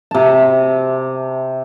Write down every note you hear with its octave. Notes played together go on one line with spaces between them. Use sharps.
C3 A5